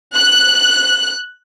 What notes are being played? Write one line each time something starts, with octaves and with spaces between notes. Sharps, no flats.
F#6